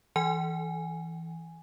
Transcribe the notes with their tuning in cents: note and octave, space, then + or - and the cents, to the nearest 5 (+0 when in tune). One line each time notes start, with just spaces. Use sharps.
E3 +0 G#5 +0